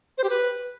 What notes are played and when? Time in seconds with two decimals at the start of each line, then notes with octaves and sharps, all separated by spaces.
0.18 C5
0.24 G4
0.30 B4